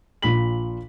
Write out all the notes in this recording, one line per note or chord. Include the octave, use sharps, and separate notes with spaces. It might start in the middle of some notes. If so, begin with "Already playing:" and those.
A#1 A#2 B5 B6 F#7